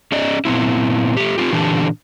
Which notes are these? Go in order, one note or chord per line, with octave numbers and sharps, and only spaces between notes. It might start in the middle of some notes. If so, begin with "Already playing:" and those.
C#4 G#4 D5 D#5
A#2 B3 C4 E4
A3 G4
C4 C#4 F4 G4
A#2 D3 E3 D4 G4 A4